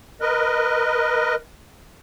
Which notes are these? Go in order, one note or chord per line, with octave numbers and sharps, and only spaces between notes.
A#4 B4 D#5